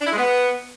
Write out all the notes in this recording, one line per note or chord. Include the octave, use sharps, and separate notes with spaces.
D4
E4
G#3
B3